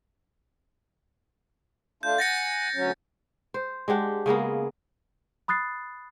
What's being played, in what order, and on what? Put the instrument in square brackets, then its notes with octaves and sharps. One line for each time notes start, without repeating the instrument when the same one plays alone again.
[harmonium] A3 D4 F4 [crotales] G6
[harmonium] F#5 G#5 [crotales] A6 A#6 C#7
[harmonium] D2 F#3 C#4
[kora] C5
G#3 D4 G4 F#5
C#3 G#3 A#3 B3
[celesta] B5 D#6 F#6 A6 C7